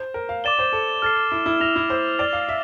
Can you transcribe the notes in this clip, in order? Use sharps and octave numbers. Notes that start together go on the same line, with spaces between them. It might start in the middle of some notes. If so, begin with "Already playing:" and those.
Already playing: C5
A#4
F5
D5 D6 A6 E7 G7
C5
A4
A4 F6 A6 C7
E4
E4
E4 E6 A#6 F7
E4
C5
D5 A6 C7 G7
F5
E5